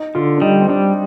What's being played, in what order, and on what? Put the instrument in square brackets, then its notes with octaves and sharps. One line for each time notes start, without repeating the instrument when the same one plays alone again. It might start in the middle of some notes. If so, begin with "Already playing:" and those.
Already playing: [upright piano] D#4
[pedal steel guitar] D3 [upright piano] F4
[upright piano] D4
[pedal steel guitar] G3 [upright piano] D#4
[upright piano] C4
[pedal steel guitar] G3 [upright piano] D4